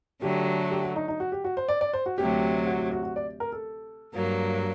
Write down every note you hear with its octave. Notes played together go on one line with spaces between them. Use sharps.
D3 F#3 A3 G4
G4
F#4
D#4
D#4
F#4
G4
F#4
C5
D5
D5
C5
F#4
D2 C3 F#3 G4
F#4
F#4
F#4
F#4
D5
A#4
A4
G2 F#3 A#3